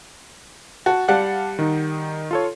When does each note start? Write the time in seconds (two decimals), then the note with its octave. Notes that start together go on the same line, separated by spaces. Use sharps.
0.86 F#4 A5
1.08 G3 D5 F5 F#5 A5 F#6
1.59 D#3 D#4
2.31 F4 A4 C#5